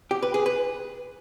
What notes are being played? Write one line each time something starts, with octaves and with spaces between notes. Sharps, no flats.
G4
B4
G#4
B4